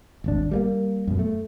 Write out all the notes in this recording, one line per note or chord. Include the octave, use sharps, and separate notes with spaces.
D#1 G#1 D4
G3 A3 A#3
F#2 B2
A3